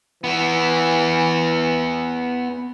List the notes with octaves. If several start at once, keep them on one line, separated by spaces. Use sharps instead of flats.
E3 B3 E4